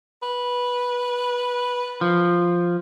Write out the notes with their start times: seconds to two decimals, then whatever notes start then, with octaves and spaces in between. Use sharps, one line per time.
0.23 B4
2.01 F3